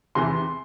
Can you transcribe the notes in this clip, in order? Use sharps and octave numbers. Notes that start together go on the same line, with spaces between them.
E2 C3 E3 C6